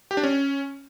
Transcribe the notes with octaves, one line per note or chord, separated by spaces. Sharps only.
G4
D4
C#4